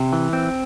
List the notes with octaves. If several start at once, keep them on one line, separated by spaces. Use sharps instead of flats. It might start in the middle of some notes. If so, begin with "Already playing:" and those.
Already playing: C3
E3
C4